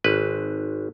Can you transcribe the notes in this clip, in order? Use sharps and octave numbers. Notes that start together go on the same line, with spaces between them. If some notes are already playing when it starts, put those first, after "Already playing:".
G#1 B4